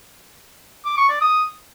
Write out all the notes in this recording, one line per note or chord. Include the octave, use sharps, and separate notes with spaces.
D6
C#6
D5
D#6